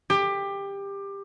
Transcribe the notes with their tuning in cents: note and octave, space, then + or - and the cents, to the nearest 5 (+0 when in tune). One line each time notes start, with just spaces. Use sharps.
G4 +20